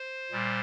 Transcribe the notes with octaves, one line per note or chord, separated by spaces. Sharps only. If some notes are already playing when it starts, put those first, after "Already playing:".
Already playing: C5
A#2 G3